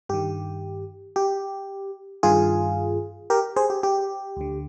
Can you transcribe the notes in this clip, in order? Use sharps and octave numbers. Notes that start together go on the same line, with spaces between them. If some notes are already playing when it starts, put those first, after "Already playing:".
G2 D#3 G4
G4
G2 D#3 F4 G#4
G4 A#4
G#4 C5
G4
G4
D2 D3